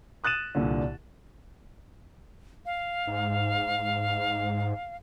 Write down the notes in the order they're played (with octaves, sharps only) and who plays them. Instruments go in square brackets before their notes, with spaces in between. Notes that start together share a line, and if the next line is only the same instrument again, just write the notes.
[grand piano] D#6 F#6 A6 D#7 E7
C2 A#2 D3
[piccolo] F5
[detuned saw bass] G#2